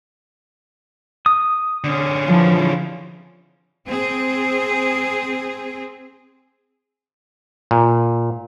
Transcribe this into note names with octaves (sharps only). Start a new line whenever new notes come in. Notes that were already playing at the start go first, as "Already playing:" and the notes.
D#6
D3 C#4
E3 F3
C4 G#4
A#2